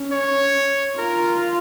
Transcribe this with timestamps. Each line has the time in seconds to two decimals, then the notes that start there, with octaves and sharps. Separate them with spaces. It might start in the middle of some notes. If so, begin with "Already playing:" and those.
Already playing: C#4
0.12 C#5
0.98 F4 A#4